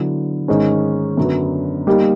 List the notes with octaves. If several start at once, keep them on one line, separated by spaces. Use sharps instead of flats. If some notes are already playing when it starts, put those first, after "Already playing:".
Already playing: D3 F#3 B3 E4
G#2 D#3 G#3 C#4
F#2 D3 F#3 B3
G3 A#3 D#4 G4